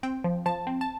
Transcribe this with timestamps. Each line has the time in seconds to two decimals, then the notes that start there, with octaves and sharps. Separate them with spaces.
0.03 C4 G5
0.24 F3
0.46 F3 A5
0.67 C4
0.81 A5